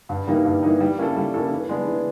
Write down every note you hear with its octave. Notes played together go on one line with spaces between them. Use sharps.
G2
E3 G3 A#3 D#4
G2
E3 G3 A#3 D#4
G3
A#3 C#4 E4 A4
G3
A#3 C#4 E4 A4
E3
G#3 B3 D4
E3